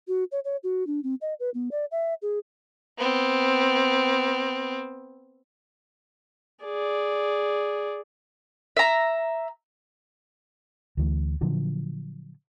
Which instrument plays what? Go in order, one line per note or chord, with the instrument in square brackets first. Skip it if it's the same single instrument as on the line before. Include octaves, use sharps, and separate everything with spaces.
[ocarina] F#4
C#5
C#5
F#4
D4
C4
D#5
B4
B3
D5
E5
G#4
[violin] B3 C4
[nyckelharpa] G#4 D5
[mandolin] E5 A#5
[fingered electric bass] D2 E3 A3
A#2 D3 F3 F#3